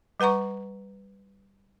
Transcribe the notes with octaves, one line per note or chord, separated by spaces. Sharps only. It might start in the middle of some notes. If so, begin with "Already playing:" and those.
G3 B4 F#5 A#5 C#6